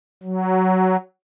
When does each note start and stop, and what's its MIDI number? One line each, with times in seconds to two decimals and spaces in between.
0.23 0.97 54